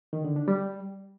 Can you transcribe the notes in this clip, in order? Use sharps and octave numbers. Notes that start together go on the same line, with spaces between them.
D#3
D3
D4
G3